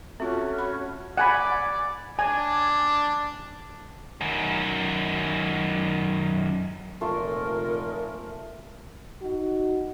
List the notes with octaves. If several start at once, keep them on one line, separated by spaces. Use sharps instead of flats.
A3 C4 C#4 F4 F#4
B5
D5 F#5 G#5 B5
D4 G#5
F#2 D#3
F1 A#2 A3 F4 A#4 G#5
D#4 F#4